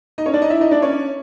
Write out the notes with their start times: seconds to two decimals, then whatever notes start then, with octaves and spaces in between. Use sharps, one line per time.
0.18 D#4 D#5
0.26 C#4 C#5
0.34 D4 D5
0.42 D#4 D#5
0.50 E4 E5
0.61 D#4 D#5
0.71 D4 D5
0.82 C#4 C#5